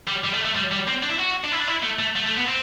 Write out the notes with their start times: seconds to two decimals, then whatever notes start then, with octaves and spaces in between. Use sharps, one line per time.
0.08 G3
0.24 G3
0.35 A3
0.45 A3
0.56 G3
0.72 G3
0.88 C4
1.03 D4
1.09 E4
1.19 F#4
1.44 D4
1.52 E4
1.60 D4
1.67 E4
1.82 A3
1.99 A3
2.15 A3
2.26 A3
2.37 B3
2.47 C4